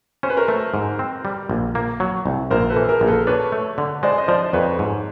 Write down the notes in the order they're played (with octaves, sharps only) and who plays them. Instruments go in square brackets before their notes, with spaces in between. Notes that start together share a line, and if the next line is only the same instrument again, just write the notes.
[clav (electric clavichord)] C#4 [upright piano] C5
[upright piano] B4
A#4 C5
[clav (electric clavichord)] A3
G#2
C4
G3
A#1
A#3
F#3
C2
[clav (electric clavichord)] A#1 [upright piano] A#4 C5
[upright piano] A4 B4
[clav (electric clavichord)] E3
[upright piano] G#4 A#4
[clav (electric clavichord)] A#1
[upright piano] A4 B4
[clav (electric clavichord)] D4 [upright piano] B4 C#5
[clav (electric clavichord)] A3
D3
[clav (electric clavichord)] G#3 [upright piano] C5 D5
[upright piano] D#5
[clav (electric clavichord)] F3 [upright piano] C5 D5
[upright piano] C5
[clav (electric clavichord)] F2 [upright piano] B4 C#5
[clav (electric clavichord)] G#2